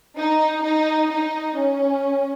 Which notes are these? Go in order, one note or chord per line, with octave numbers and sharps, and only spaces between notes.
D#4
D#4
D#4
C#4